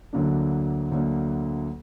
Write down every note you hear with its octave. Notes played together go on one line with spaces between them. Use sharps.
D2 D3 F#3 A#3 D4
D2 D3 F#3 A#3 D4